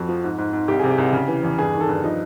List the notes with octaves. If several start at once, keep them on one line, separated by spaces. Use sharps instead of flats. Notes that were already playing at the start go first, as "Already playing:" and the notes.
Already playing: F2 F#4
F3
G#2
G#2
G#2
C2 G4
C3 G#4
G4
C2
C#3
E3
E2
G2 G#4
D#3
A4
G2
F3 D#4